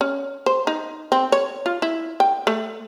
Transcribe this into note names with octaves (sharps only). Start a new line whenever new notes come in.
C#4
C5
D#4
C4
C#5
F4
E4
G5
A3